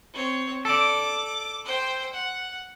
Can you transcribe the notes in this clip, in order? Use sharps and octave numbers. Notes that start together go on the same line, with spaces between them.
C4 C#5
A4 D5 D6
C5 G5
F#5